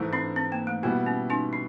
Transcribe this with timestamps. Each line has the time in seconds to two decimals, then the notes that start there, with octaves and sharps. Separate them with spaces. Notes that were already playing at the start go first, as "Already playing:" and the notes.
Already playing: G#2 E3 A3
0.13 C4 D4
0.36 C4
0.52 A#3
0.67 A3
0.83 B2 G3 A#3 B3 E4
1.06 C#4
1.30 C#4 D#4
1.53 D4